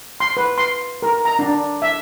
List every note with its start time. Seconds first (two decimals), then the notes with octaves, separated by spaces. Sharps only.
0.20 C6
0.37 B4
0.58 C6
1.02 A#4
1.25 A#5
1.39 D4
1.82 E5